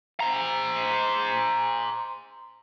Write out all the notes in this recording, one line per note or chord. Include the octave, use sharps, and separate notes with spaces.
C5 A#5